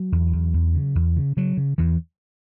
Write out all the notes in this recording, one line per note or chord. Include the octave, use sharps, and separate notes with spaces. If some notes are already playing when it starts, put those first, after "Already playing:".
Already playing: F#3
E2
E2
E2
C#3
E2
C#3
C#3 F#3
C#3
E2 E3